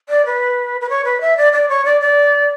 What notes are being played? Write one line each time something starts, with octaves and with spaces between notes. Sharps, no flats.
D5
B4
B4
C#5
B4
E5
D5
D5
C#5
D5
D5